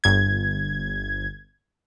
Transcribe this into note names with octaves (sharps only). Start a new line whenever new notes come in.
G1 G#6